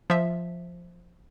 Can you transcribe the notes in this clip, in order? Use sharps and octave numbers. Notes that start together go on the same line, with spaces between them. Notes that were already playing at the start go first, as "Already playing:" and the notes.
F3 E5